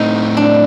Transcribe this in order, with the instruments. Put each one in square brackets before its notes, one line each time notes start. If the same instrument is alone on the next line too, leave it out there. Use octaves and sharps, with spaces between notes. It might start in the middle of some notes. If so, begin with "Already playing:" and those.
Already playing: [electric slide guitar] A2 A3 C4 [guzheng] D#4
[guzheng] D4